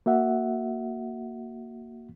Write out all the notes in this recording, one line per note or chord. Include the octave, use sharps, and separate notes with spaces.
A#3 F#4 E5 F#5